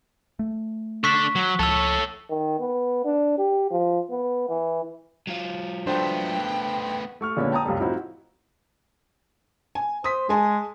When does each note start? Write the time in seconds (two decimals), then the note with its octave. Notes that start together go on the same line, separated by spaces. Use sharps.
0.39 A3
1.04 D4 A4 C#6 B6
1.35 F#3
1.59 C#2 F3 A4 C#5 A5 E6
2.30 D#3
2.60 B3
3.05 D4
3.38 G4
3.71 F3
4.10 B3
4.49 E3
5.27 F#3 F4
5.87 A3 B3 D4 C5 G5
7.21 A3 C#6 F6
7.36 A#2 D3 G#3 B3 C#4 D4
7.52 G5 A5 A#5 D#6
7.65 C#2 F#2 C3 G3 A3
7.80 A2 F3 C4 D#4 E4 F#4
9.75 G#5
10.04 C5 D#6 B6
10.29 G#3 G#4 G#5 A5